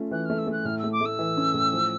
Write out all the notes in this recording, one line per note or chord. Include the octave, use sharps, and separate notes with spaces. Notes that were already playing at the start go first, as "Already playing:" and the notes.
Already playing: A3 C#4 F4
E3 F#6
A3 F6
E6
A3 F#6
A2 F6
E6
A3
D6
A3 E6
E3
C#4
A2
F3